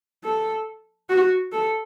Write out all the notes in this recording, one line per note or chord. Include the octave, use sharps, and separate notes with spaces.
A4
F#4
A4